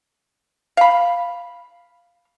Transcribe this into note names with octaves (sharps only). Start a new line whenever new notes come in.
F5 B5